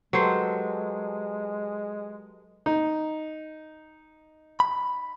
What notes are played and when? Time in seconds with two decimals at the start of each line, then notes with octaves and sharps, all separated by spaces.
0.13 F#3 G#3 G4 A4 B4 C5
2.66 D#4
4.60 B5